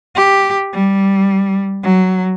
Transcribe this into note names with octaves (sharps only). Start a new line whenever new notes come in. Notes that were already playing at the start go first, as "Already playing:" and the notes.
G4
G3
F#3